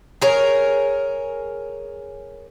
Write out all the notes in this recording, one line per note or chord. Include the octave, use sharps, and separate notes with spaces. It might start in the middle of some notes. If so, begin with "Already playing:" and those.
G#4 A#4 C#5